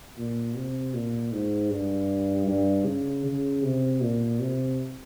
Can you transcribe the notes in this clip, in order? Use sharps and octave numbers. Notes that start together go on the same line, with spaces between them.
A#2
C3
A#2
G#2
G2
G2
C#3
C#3
C3
A#2
C3